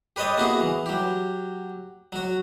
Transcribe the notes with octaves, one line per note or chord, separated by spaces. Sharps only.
G4 B4 C#5 D#5 A5
A#3 B3 E4 F#4 G#4
E3
F#3 G4
F#3 F#4